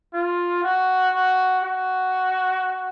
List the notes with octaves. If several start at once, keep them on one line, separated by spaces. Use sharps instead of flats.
F4
F#4
F#4
F#4